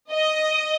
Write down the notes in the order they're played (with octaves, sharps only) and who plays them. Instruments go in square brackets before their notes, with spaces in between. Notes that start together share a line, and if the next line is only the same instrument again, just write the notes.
[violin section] D#5